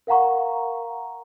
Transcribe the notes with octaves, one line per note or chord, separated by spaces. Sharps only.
A#4 F5 F#5 A#5 C#6